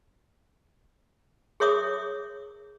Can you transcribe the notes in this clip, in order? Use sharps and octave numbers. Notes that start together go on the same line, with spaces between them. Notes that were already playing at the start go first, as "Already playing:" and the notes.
G#4 A#4 C#5 E5 D6 D#6